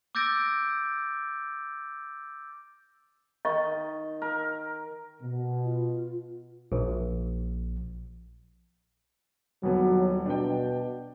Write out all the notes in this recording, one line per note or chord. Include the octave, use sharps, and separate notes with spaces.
D6 E6 G6 A6 A#6 D7
D#3 D#5 C#6
A#4
B2
F4
A#1
D#1 F#3 B3
B2 D4 G5